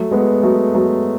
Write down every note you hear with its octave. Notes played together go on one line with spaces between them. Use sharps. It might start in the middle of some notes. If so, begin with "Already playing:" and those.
Already playing: F#3 A3
G#3 B3
F#3 A3
F#3 A3